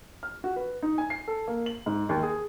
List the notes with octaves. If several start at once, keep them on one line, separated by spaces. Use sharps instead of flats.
F6
F#4
B4
D#4
G#5
C7
A4
A#3
F#7
G#2
D#2
G#4